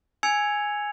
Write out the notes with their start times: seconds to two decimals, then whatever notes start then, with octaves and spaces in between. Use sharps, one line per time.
0.23 G#5 E6 G#6 C#7 F7